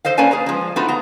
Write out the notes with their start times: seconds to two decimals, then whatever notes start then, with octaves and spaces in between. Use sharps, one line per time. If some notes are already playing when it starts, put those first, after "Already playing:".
0.05 A4 C5 D#5 F5
0.17 A#3 C#4 B4 D5 G#5 A5
0.31 G#4 B4 A#5
0.46 F3 G#3
0.76 A3 B3 D#4 F4 F#4 B4
0.88 B3 A#5